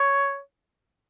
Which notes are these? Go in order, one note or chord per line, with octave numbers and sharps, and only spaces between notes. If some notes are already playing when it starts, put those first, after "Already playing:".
Already playing: C#5